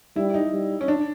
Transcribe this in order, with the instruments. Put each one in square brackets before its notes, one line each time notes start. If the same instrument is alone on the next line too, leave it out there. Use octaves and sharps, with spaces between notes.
[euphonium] G3 [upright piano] E4
[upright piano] D#4
[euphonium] G3
[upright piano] C#4
D4